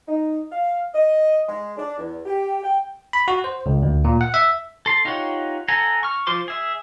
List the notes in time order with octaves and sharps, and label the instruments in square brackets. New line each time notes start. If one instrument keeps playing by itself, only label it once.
[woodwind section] D#4
F5
D#5
G#3
D4
E2
G4
G5
[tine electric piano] B5
F#4
C5
C#2
D2
A#2
F#5
E5
[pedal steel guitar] A4 C6
D#4 F4 G4 C#5 F#5
A4 F#5 G#5 A#5
C#6 F6
F3 F4 C5 C6 D6
G#4 E5